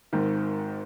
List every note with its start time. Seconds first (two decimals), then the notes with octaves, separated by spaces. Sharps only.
0.13 G#1 G#2 D#3